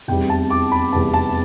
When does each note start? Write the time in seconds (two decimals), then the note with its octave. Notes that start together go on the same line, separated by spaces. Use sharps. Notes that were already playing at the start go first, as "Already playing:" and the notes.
0.08 F1 E2 C3 G3 B3 G5
0.30 A5
0.50 D6
0.72 B5
0.92 F1 E2 C3 G3 B3 A5
1.14 A5